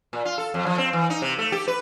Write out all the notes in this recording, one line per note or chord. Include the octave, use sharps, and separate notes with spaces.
A#2
F4
A4
F2
F3
C4
E3
D#4
C3
A3
G4
B4